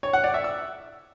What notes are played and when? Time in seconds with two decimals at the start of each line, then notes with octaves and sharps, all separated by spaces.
0.03 C#5
0.13 F#5
0.24 D5
0.34 E5
0.44 E6